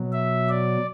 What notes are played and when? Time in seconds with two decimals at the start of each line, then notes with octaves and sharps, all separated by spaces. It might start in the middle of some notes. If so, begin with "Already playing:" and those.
Already playing: B2 F#3
0.13 E5
0.49 D5